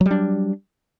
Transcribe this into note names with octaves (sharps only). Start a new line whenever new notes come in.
F#3 G3 D4